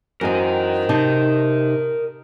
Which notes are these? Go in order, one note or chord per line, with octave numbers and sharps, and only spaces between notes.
F#2 E3 C4 A#4 D#5
C3 D#4 A5